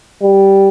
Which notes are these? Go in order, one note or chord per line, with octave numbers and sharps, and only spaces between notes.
G3